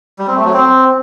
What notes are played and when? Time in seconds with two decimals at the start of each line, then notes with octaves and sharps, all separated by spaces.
0.19 G3
0.27 C4
0.36 A3
0.45 F#3
0.54 C4